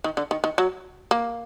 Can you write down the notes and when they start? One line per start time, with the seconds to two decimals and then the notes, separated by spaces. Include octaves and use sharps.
0.04 D#3
0.17 D3
0.31 D#3
0.44 D#3
0.58 F#3
1.11 A#3